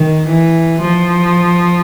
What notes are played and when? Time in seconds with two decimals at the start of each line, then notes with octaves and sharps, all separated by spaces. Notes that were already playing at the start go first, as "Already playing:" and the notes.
Already playing: D#3
0.27 E3
0.81 F3